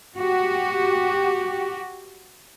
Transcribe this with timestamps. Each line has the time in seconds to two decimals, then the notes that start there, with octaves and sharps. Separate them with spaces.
0.16 F#4 G4